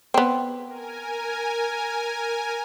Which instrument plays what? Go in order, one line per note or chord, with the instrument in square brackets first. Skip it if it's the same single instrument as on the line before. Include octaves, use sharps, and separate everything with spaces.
[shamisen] B3 C4
[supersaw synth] A#4 G#5